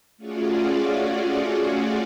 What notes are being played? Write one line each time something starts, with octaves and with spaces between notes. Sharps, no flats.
A3 C#4 F4 F#4 G#4 D5